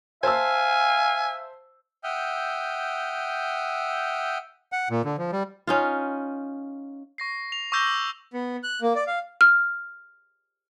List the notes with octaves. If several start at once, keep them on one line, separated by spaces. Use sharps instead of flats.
C5 E5 F5 G#5 A5 E6
E5 F#5 G5 D#6 F6 G6
F#5
A#2
D3
F3
G3
C#4 D#4 F4
C#6 A#6 C7
F7
C#6 D6 E6 G6 A#6 G7
F#7
B3
F#6
A#3
D5
F5
F6